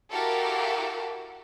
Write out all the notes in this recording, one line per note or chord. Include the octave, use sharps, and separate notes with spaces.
E4 F#4 G4 A4 A#4 F5